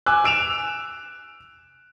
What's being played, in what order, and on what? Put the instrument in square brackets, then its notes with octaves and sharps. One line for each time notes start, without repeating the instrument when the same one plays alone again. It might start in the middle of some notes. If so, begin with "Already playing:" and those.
[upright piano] G#5 D6 E6 F#6
E6 D7 E7 F7